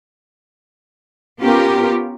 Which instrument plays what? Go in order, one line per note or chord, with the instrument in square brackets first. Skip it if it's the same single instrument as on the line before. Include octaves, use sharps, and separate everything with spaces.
[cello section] B3 C#4 F4 G4 A#4